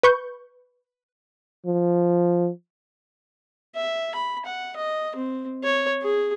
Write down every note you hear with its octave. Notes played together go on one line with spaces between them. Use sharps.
B4 C#6 G6
F3
E5
B5
F#5
D#5
C4
C#5
G#4